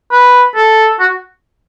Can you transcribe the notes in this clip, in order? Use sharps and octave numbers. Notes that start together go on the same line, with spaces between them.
B4
A4
F#4